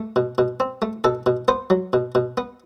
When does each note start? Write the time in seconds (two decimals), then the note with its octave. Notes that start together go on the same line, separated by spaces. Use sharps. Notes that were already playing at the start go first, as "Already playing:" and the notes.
Already playing: A3
0.16 B2
0.38 B2
0.60 C4
0.82 A3
1.04 B2 A4
1.26 B2
1.48 B3 C5
1.70 F#3
1.93 B2
2.15 B2
2.37 B3